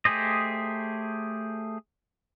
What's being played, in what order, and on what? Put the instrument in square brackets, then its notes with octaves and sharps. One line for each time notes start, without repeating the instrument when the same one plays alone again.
[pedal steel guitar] A3 G4 G#4 C5 D#5